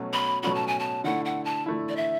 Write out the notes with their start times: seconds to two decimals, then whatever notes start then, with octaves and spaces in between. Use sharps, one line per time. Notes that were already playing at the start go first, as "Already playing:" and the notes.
Already playing: B2 F#3 A3 C#4 F#4
0.13 B5
0.43 B2 F#3 A3 C#4 F#4 B5
0.55 A5
0.68 G#5
0.79 A5
1.04 D3 A3 E4 F#5
1.25 F#5
1.45 A5
1.66 D3 A3 E4
1.89 D5
1.96 E5